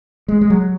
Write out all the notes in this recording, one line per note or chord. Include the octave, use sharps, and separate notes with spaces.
G#3
G#3
F#3